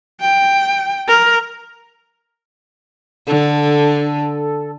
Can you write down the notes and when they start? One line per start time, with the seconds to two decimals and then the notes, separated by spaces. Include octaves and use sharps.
0.21 G5
1.08 A#4
3.27 D3 A4